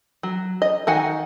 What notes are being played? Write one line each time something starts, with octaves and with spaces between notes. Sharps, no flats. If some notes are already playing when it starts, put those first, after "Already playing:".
F#3
D#5
D#3 F#4 F#5 G#5